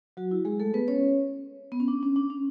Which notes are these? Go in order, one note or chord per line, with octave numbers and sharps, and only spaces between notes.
F#3 F#4
E4
G#3 G#4
A3 A4
B3 B4
C#4 C#5
B3
C#4
D4
C#4
D4
C#4